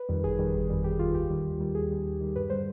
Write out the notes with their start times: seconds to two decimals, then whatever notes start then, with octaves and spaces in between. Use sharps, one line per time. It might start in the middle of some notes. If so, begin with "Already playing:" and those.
Already playing: B4
0.09 F2 D#3 G3
0.24 G1 G#4
0.39 F2 D#3 G3
0.54 G1
0.70 F2 D#3 G3
0.84 G1 G4
0.99 F2 D#3 G3 F4
1.14 D#2 G4
1.30 D#3 G3
1.45 D#2
1.60 D#3 G3
1.75 D#2 G#4
1.91 D#3 G3
2.05 D#2
2.21 D#3 G3
2.36 G2 B4
2.50 D3 G3 C5